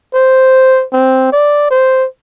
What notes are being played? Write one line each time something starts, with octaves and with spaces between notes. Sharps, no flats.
C5
C4
D5
C5